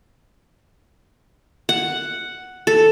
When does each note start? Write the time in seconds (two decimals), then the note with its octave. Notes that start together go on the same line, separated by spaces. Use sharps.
1.69 F#5
2.67 A4